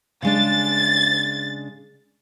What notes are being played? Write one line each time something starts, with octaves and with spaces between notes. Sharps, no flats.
C#3 G#3 D4 A6